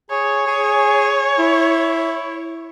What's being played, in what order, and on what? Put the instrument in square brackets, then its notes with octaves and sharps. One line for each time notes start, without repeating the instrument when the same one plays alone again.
[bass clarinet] G#4 [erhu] C#5
[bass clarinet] G#4
E4